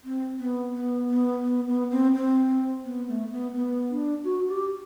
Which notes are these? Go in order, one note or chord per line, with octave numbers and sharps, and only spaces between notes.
C4
B3
B3
B3
B3
B3
C4
C4
B3
A3
B3
B3
D4
F#4
G4